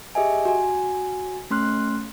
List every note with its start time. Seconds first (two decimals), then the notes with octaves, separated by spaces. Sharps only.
0.15 G4 G#4 D#5 E5 G#5
0.45 F#4 G#5
1.50 A3 C#4 C6 F6 F#6